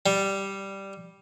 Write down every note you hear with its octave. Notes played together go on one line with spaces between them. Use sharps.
G3